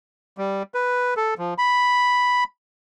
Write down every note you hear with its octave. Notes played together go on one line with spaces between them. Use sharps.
G3
B4
A4
F3
B5